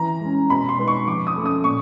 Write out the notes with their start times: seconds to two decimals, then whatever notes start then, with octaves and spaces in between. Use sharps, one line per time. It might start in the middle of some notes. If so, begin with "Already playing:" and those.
Already playing: E3 A#5
0.21 G#3 C#4
0.50 B2 B5
0.69 C6
0.78 G#3 B3 D#4
0.88 C#6
1.08 F3 D6
1.27 D#6
1.36 A3 C#4
1.46 D#6
1.64 A#2 C#6